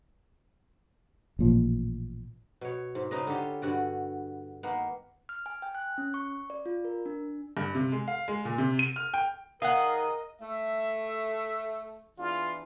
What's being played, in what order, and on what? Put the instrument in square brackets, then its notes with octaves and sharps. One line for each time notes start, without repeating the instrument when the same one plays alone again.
[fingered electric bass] A1 A#2 F3
[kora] B2 C#5
G#2
C#3 D#4 B4 D#5
D3 C#4 F4 G4
G2 D3 F#4 D5
D#3 A#3 B3
[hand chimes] F6
G#5
G5
F#6
C#4
C#6
D5
F4
A#4
D4
[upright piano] G2
C3
G#3
F5
G#3
A#2
C3
D#7
F6
G5
[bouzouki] D#3 G#4 F#5 [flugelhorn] A#4 [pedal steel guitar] D#5 [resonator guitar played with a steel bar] F5
[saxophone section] A3 [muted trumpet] E5
[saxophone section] E2 E3 D4 [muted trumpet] F4